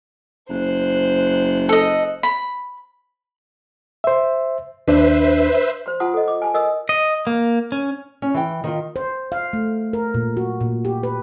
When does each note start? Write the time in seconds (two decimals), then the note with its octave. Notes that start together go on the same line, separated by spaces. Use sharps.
0.49 F#1 C5 F#6
1.69 A4 D#5
2.23 B5
4.04 C5 E5
4.88 D#2 D4 B4 C5 E5
5.86 C5 C6
6.00 F4 F#5 A5 C6 D#6
6.14 A4 D#5
6.28 D6
6.42 G#5 A5
6.54 A#4 D#5 D#6 E6
6.89 D#5
7.27 A#3
7.72 C#4
8.22 C#4
8.34 E3 G5
8.64 D#3 F4
8.96 C5
9.32 F5
9.53 A3
9.93 A#4
10.14 A#2
10.37 F#4
10.60 A#2
10.85 G4
11.03 B4